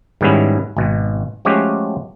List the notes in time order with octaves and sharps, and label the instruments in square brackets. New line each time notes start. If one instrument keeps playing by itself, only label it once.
[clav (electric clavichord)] G#2 D#3 G3 B3 C#4 E4
G#1 B2
F3 G#3 A3 C#4 F#4 G4